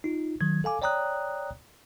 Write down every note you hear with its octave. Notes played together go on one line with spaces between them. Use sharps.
D#4 F4
D#3 F#3 G#6
A4 F5 G#5 D6
C#5 D5 G5 A#5 D#6 F#6